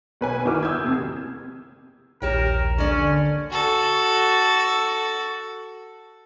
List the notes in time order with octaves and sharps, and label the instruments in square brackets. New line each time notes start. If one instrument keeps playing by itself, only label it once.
[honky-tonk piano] B1 B4 G#5
G1 D#3 E4 F#4 D6 F6
D#6 E6 G6 G#6
F1 F2
[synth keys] A#1 D#2 E7 [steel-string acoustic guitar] G4 C#5 G5 [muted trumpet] A#4
[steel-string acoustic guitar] D3 A#3 D5 [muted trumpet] C#4
[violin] F#4 A4